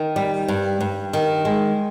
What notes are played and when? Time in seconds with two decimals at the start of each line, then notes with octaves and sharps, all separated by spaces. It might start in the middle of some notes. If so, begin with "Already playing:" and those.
Already playing: D#3
0.16 G3
0.48 G2
0.81 G2
1.13 D#3
1.45 G#3